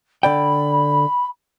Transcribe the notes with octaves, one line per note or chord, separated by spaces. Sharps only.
D3 D5 G5 B5